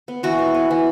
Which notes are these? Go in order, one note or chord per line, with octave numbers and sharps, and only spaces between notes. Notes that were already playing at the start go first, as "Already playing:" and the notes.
B3
E3 F#4
B3
B3
E3